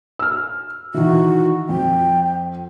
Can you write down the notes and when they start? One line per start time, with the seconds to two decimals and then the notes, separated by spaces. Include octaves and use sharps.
0.19 E6 F6
0.94 D#3 E3 F#4
1.69 F2 G5